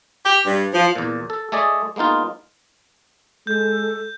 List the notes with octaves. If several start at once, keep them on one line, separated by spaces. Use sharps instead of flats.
G4
G2
F3
E2 A#2
A4
A3 G#4 D5 D#5
G#3 A#3 B3 D#4 F4
G#3 A4 G6